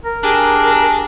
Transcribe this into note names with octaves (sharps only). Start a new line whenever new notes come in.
A#4
D4 G4 G#4